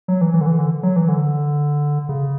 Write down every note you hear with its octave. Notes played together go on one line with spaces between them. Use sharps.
F#3
E3
E3
D3
E3
D3
F#3
E3
D3
C#3